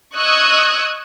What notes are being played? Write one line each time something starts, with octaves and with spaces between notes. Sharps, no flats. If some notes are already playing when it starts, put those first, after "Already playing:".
D#5 C#6 D#6 E6 F#6 G#6